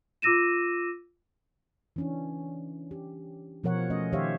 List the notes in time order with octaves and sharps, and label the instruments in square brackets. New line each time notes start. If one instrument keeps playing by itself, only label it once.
[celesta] F4 D6 E6 A#6 D#7 E7
[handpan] E3 C#4 D4
G4
B2 F3 A#4 C#5 F#5
A3 C#4 D#5
D#3 G4 C5 C#5 E5 F5